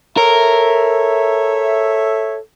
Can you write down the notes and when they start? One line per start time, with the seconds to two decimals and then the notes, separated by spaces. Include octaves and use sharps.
0.17 A4 A#4 C#5 E5